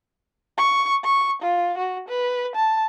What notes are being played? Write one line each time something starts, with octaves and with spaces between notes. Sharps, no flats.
C#6
C#6
F4
F#4
B4
A5